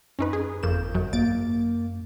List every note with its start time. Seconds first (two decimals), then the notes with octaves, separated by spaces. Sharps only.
0.19 F#2 C#4 D#4 B4
0.33 G#4
0.63 G1 F2 A#3 G6 E7
0.94 F#2 F#3
1.13 G#1 F#2 A#3 A6 D7